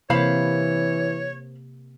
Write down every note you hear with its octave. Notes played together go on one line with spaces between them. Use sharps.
C3 E3 A#3 C5 C#5 F5 B5